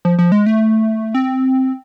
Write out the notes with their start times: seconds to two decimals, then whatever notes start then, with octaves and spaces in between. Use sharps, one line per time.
0.05 F3
0.19 F3
0.32 G#3
0.46 A3
1.15 C4